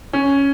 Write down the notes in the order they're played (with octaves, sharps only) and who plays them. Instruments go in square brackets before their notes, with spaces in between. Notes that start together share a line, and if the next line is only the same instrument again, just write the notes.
[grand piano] C#4